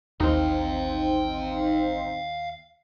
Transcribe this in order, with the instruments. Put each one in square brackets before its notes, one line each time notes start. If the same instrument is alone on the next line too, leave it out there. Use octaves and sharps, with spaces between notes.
[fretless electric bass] A1 [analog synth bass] D#2 [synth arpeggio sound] C4 D#4 [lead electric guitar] F5 G5